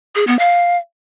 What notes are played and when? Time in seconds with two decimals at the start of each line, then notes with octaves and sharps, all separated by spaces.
0.15 G#4
0.27 B3
0.39 F5